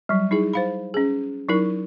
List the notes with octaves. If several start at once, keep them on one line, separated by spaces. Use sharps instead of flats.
F#3 G3
D#4 E4 G#4
C5 F5 B5
C#4 G#4
F#3 D#4 E4 A#4